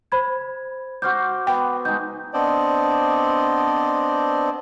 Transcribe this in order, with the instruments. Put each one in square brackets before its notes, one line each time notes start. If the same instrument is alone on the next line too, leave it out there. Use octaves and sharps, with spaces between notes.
[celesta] C5 B5 G#6
[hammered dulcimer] F#4 C5 D6 [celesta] F6 G6
[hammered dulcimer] B3 [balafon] G5
[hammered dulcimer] G#3 D#4 [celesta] G6
[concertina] B3 C4 D4 C5 D5 D#5